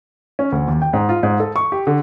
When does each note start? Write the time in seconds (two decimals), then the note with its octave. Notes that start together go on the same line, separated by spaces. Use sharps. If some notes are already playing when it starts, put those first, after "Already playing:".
0.39 C#4
0.52 D2
0.68 D#2
0.82 G5
0.93 G#2
1.09 F4
1.23 G#2
1.40 A4
1.56 C#6
1.72 G4
1.87 D3